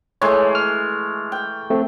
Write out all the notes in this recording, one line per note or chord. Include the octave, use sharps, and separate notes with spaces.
E3 G#3 A3 C#5
F6
G5
A3 C4